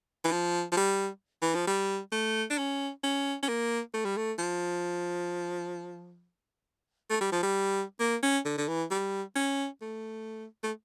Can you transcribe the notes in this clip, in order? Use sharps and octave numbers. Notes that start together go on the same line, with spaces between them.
E3
F3
F3
G3
E3
F3
G3
A3
D4
C#4
C#4
C#4
A#3
A3
G3
A3
F3
A3
G3
F3
G3
A#3
C#4
D3
D3
E3
G3
C#4
A3
A3